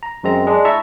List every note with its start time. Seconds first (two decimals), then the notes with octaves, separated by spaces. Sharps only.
0.03 A#5
0.23 F#2 G#3 C4 A#5
0.47 G#3 D4
0.65 E4 E5 A5 A#5 C#6